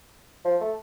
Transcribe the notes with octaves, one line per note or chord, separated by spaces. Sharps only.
F3
A3